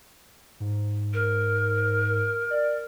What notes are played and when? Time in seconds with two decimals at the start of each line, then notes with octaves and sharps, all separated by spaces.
0.60 G#2
1.14 A#4
2.50 D5